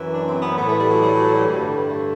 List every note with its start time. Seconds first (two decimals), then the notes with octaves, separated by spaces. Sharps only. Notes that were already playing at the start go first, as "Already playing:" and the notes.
Already playing: F#2 E3
0.14 D4
0.29 C4
0.42 B3
0.57 A2 E3 B3
0.69 A3
0.80 G3
0.91 F#3
1.03 G3
1.13 F#3
1.25 F#3
1.35 G3
1.47 G2 D3
1.91 A3